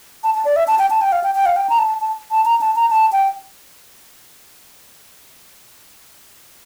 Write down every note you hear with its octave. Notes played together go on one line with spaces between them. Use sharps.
A5
A5
D5
E5
A5
G5
A5
G5
F5
G5
G5
F5
G5
A#5
A5
A5
A5
A#5
A5
A#5
A5
G5